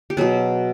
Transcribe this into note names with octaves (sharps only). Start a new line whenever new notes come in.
G4
B2 F#3 B3 G#4